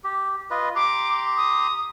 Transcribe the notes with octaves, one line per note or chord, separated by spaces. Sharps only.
G4
F4 B4 D#5
G4 A#5 C6 D6
D#6